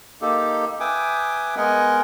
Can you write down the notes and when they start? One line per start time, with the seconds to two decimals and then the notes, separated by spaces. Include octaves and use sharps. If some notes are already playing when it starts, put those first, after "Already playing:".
0.22 A#3 D#4 G4 A4
0.80 B4 E5 G5 G#5 D6 D#6
1.57 G#3 B3 A#4 D#5 F#5 G#5